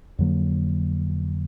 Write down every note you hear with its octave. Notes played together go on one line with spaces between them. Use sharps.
F2 D3 F#3 A#3